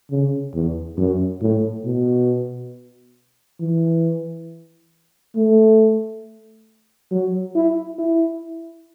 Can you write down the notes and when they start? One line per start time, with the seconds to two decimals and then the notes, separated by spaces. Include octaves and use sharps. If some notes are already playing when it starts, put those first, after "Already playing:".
0.11 C#3
0.54 E2
0.97 F#2
1.42 A2
1.85 B2
3.61 E3
5.37 A3
7.11 F#3
7.56 E4
7.99 E4